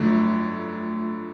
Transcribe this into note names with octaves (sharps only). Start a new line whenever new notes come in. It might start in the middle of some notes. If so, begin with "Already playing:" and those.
Already playing: G1 F2 D3 F#3 A3